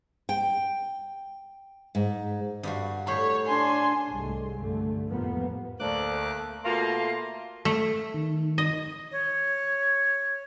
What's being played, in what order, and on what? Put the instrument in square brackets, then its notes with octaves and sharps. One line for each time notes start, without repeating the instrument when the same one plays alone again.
[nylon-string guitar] G5
G#2
[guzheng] G2 F4 F#4
[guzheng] A2 C5 B5 [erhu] C#5
[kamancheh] D4 G#5 [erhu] C6
[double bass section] C2 G#2 G#3 A3
G2 D3 A3
F2 A2 F3 G3 A#3 B3
[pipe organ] D2 D6 F#6 [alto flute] A3 [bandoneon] A#3 [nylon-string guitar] C5 D5
[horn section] B2 A3 A#3 F4 C6
[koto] A3
[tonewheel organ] D#3
[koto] D#5
[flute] C#5